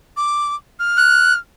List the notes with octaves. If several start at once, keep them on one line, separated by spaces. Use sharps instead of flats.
D6
F6
F#6